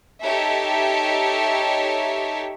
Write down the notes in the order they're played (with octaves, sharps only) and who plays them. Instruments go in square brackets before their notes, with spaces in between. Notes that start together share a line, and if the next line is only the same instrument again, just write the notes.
[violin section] D#4 G4 A4 C#5 E5